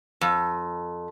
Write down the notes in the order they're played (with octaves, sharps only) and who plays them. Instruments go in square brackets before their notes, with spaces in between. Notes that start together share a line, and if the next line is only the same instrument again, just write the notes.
[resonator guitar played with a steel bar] F2